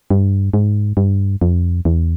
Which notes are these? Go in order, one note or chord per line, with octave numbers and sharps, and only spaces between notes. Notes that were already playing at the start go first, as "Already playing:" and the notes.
G2
G#2
G2
F2
E2